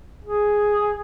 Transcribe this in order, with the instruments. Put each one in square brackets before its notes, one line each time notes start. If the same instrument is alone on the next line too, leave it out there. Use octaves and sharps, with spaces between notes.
[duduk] G#4